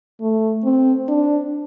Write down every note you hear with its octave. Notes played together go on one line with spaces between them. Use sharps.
A3
C4
D4